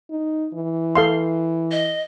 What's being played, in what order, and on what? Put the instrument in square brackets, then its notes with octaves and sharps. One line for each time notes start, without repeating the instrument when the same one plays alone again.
[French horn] D#4
E3
[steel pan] A4 F5 C6
[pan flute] D#5